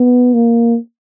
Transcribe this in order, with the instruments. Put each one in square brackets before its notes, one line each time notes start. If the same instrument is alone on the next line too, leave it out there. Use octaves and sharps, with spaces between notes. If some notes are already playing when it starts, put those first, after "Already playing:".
Already playing: [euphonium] B3
A#3